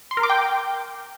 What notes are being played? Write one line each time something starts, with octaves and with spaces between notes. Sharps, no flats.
C6
A#4
D6
G5